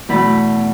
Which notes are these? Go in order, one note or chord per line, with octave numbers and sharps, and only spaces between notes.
E2 B2 A3 B5